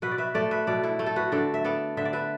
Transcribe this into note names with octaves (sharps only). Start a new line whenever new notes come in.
B2 F#4 B4
D5
B4 E5
A3 A4 D5
B4 E5
B2 A4 D5
E4 A4
A3
A4
F#4 B4
D3 A4 D5
E5
B3 A4 D5
D3 E5
D5
B4 E5